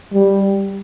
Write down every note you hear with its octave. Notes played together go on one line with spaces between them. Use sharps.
G3